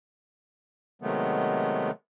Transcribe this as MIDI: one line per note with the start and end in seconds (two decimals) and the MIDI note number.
1.02 1.91 48
1.02 1.91 51
1.02 1.91 54
1.02 1.91 56
1.02 1.91 57
1.02 1.91 59